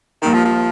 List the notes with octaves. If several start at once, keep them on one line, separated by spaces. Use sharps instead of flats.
A#1 A#2 D#3 G3 A#3
F3
F3